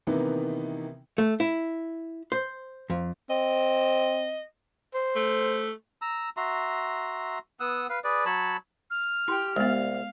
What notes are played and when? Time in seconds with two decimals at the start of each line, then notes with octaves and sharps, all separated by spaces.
0.07 C3 D#3 E3 A#3 B3 D#4
1.18 A3
1.40 E4
2.32 C5
2.90 F2
3.30 C4 D#5
4.94 C5
5.16 A3
6.02 A#5 E6
6.37 F#4 E5 A#5 C6
7.60 B3 F#5 D#6 E6
7.90 B4 F5
8.04 G#4 B4 D5
8.26 F#3 C#5 A5 B5
8.91 F6
9.28 E4 G4 G5 C6
9.56 C2 G#3 B3 F5